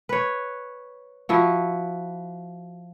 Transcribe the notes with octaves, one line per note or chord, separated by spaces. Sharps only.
B4 C#5
F3 E4 F#4